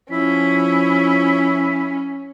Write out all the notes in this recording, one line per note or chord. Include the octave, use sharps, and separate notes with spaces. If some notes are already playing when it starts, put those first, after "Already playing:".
F3 C#4 E4 B6